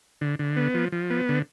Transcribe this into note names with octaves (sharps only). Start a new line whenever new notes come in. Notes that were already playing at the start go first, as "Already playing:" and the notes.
D3
D3
B3
F3
F3
B3
D3